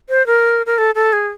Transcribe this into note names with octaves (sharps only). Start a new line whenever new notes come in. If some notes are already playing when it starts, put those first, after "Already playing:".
C5
A#4
A#4
A4
A4
G#4